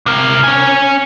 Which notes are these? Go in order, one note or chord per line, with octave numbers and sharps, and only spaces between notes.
C3 A#4
C#4 G#5